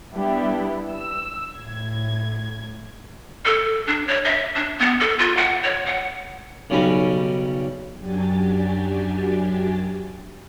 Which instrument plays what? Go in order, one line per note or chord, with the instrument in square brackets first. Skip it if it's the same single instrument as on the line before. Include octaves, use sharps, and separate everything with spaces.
[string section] G3 B3 D4 E4 G4
E6
A2 G#6
[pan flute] A4
D4
C#5
E5
D4
B3
A4
F4
F#5
C#5
F#5
[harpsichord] B1 C#3 G3 C#4 B4 A#5
[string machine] F#2 F#3 D4 G4 G#5 A6